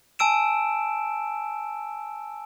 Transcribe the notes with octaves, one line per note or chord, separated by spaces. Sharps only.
G#5 A5 E6 D7 E7